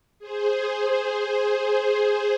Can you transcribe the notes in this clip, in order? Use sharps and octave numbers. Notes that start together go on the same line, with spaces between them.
G#4 C5